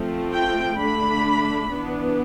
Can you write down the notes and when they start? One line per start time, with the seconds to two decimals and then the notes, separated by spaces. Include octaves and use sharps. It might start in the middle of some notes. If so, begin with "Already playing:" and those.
Already playing: F3 A3 C4
0.32 G5
0.78 D3 A3 D4 B5
1.70 E3 B3 D4